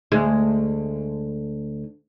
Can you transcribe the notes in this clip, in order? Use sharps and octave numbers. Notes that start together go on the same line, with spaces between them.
D2 G#3